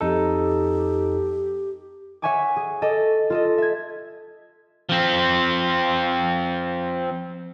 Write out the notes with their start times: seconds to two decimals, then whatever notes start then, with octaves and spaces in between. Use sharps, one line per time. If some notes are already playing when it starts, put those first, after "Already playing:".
0.01 F2 D#4 G4 A4
2.22 C#5 E5 F#5 G#5 C#6 D6
2.56 G#4
2.82 A4 D#5 D6
3.30 F4 A4 D#5
3.58 E5 G#6
4.89 F3 C4